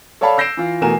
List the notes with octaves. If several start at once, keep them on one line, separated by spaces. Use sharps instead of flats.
A4 C#5 D5 F5 A5 B5
E6 G6 A#6 C7 D7 E7
E3 F4
B2 E3 A3 A#4 G#5 E7